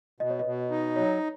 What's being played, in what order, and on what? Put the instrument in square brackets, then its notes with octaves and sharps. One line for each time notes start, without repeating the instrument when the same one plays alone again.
[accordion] B2 [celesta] D#5
[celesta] C#5
B4 D#5
[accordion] B2
D#4
[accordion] F#3 [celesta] C#5